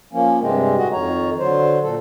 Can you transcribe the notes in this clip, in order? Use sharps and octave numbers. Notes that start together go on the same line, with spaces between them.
F3 A#3 C#4
G2 C3 G#3 C4
A2 F#4 D#5
F2 D#3 C#5 A#5
D3 F#3 C5
A#2 A4